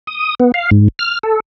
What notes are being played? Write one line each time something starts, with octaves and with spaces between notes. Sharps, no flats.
D#6
B3
F5
G#2
F6
A4